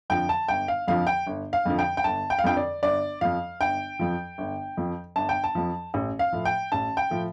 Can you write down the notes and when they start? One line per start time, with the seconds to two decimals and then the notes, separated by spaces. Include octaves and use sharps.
0.10 F2 D3 F3 G5
0.29 A5
0.48 G1 G5
0.68 F5
0.88 F2 D3 F3 F5
1.07 G5
1.27 G1
1.53 F5
1.65 F2 D3 F3
1.79 G5
1.97 G5
2.04 G1 A5
2.30 G5
2.39 F5
2.44 F2 D3 F3 G5
2.57 D5
2.83 G1 D5
3.21 F2 F3 F5
3.61 G1 G5
3.99 F2 F3
4.38 G1
4.77 F2 F3
5.16 G1 A5
5.29 G5
5.44 A5
5.55 F2 F3
5.94 A1
6.19 F5
6.33 A2 F3
6.45 G5
6.72 A1 A5
6.97 G5
7.11 A2 F3